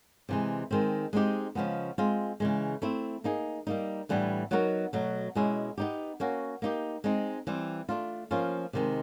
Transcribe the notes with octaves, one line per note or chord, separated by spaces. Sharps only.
C3 E3 G#3
D#3 G#3 C4
G#3 C4 D#4 G4
C#3 F3 G#3 B3
G#3 C4 F4
C#3 E3 G#3
A3 C4 E4
A#3 D#4 G#4
G3 A#3 D#4
A2 E3 G3 B3 D4
F#3 B3 D#4 F#4 A#4
B2 F#3 A3
B2 G#3 C#4 E4
B3 D#4 G4
A#3 C#4 F#4
A#3 D#4 G4
G#3 C4 D#4
E3 G3 C4
A3 D4 F4
F3 A#3 C#4 F4
C3 D#3 G#3